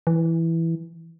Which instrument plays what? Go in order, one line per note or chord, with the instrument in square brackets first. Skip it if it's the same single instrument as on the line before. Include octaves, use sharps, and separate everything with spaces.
[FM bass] E3